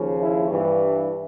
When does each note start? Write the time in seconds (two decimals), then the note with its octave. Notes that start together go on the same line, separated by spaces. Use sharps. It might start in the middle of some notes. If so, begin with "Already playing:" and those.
Already playing: D#2 C#3 F3
0.21 E4
0.50 G2 E3